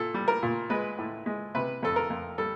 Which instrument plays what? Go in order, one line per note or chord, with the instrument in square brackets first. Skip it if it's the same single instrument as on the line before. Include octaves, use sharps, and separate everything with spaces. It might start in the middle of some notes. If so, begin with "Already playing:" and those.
Already playing: [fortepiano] A#2 A4
G3
A#4
A#2
G#3 B4
A2
G#3
C3 B4
F2 A4
A#4
F2
G3 A4